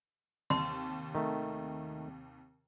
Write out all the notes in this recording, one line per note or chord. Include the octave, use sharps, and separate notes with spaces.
D#2 C3 A5 C6
D#3 A3